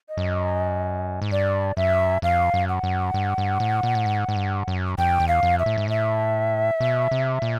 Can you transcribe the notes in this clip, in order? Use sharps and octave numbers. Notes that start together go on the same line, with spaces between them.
D#5
F#2
G#2
G2 D5
F#2 E5
F2 F5
F#2
F#5
F#2
G2
G2
A2
A#2
A2
G#2
G#2
G2
F#2
F2 G5
E2
F5
F2
E5
A2
G#2
A2 E5
B2
C3
A#2